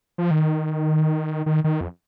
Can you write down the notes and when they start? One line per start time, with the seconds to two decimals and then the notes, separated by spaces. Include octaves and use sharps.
0.18 F3
0.31 D#3
1.46 D#3
1.64 D#3
1.81 F2